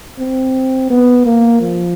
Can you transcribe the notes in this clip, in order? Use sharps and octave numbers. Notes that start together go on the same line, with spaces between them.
C4
B3
A#3
F3